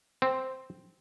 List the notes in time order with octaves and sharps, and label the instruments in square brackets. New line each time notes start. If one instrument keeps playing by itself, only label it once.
[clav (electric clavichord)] C4